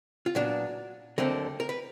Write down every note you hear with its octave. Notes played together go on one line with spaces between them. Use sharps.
F4
A#2 F#3 B3 D4 F#4
D#2 D3 F#3 A3 C4 A#4
A#4
B4